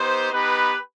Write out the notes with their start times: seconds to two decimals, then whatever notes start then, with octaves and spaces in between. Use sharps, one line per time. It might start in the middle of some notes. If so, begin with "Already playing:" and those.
Already playing: B3 D#4 G4 C5
0.32 B3 D#4 G4 B4